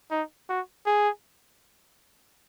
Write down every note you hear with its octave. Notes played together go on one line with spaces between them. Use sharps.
D#4
F#4
G#4